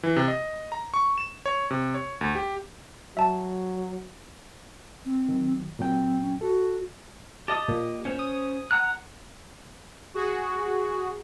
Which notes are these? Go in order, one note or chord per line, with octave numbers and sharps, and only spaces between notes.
E3
C3
D#5
A#5
C#6
E7
C#5
C3
C#5
D2
G4
F#3 E5 A5
C4
D#3 F#3
A#2 F#3 C4 G5
C#4
F#4 A4
G4 D#5 A5 D#6
A#2
C#4 C5 C#5
D#6
F#5 A#5 F#6
F#4 G#4